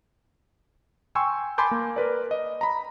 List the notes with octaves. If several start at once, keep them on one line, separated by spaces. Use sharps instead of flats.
G5 G#5 C6 C#6 E6
G#5 A5 B5 C6 D6 G6
A#3
A#4 B4 D5
D#5
A#5 B5